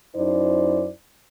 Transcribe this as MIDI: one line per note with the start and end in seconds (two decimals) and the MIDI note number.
0.16 0.89 42
0.16 0.89 63
0.16 0.89 64
0.16 0.89 72
0.16 0.89 74